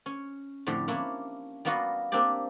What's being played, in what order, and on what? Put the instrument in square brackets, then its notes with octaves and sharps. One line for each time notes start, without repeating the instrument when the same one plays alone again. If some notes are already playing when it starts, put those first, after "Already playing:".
[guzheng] C#4
F2 A2 D3 G4 C6
A#3 C#4 D4 E4
G3 A#3 B3 F4 F#4
A#3 C4 D4 G4 D5